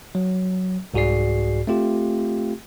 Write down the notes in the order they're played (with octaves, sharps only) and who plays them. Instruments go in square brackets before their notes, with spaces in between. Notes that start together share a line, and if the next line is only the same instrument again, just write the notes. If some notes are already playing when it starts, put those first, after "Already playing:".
[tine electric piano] F#3
C2 G#2 F#4 G#4 D5 C7
A3 C4 F4 G4